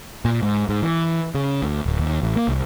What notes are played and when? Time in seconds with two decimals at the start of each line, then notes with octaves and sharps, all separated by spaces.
0.25 A#2
0.42 G#2
0.69 G#2
0.82 E3
1.35 C#3
1.62 D2
1.86 D1
2.00 D#2
2.22 A1
2.36 A#3
2.48 C2